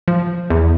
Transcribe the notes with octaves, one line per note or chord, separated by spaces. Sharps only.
F3
E2